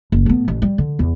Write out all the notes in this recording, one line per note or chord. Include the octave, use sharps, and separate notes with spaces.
F#1
A2 B3
A1
G3
D3
E2